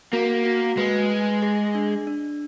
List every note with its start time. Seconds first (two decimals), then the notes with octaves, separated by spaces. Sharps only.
0.13 A#3 F#4
0.45 F#4
0.77 G#3 B4
1.10 G#5
1.42 G#4
1.75 D4
2.07 D4